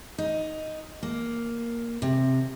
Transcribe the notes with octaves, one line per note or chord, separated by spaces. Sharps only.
D#4
A#3
C3